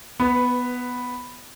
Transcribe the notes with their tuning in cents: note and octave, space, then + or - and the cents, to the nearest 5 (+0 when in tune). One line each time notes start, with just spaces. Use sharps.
B3 +0 B4 +25